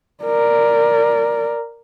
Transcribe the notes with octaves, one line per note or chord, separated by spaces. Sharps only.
A#4 D5